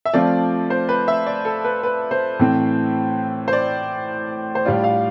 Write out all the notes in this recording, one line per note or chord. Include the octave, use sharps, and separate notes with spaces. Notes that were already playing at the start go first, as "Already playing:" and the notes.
E5
F3 A3 C4 F4 D5
C5
B4
E5
D5
A4
B4
B4
C5
A2 E3 A3 C4
C5
D5
C5
A2 G3 D4 F4 D5
F5